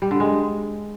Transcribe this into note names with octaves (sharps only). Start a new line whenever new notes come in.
G3
D3
G#3